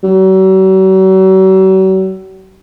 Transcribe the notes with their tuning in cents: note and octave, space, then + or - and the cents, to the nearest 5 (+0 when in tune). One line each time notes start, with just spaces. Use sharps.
F#3 +45